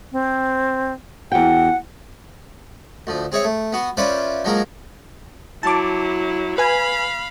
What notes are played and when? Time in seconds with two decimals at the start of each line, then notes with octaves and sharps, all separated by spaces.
0.12 C4
1.32 E2 F#4 F#5 G5
3.07 D2 F3
3.32 C4 G#4 C#5 E5
3.44 A3
3.73 B3 F#4
3.97 C#4 F4 B4 C5 D5 E5
4.44 F3 F#3 G#3 A#3 A#4
5.63 F#3 E4 A5 D6
6.58 B4 F5 G#5 B5